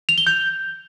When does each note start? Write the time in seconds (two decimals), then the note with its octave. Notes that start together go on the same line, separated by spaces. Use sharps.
0.09 F7
0.18 G7
0.27 G6